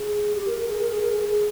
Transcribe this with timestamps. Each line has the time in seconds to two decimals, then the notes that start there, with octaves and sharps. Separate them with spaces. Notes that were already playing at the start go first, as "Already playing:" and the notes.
Already playing: G#4
0.35 G4
0.47 A#4
0.58 A#4
0.68 G#4
0.79 A#4
0.90 G#4
1.01 A#4
1.12 G#4
1.23 G#4